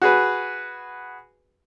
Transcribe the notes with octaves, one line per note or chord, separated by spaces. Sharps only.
F#4 G#4 B4